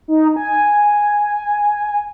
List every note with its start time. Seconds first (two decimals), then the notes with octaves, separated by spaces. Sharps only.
0.08 D#4
0.36 G#5